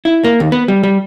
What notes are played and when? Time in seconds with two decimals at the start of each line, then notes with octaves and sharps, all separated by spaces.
0.05 E4
0.24 A#3
0.40 D#2
0.52 B3
0.68 G3
0.83 G3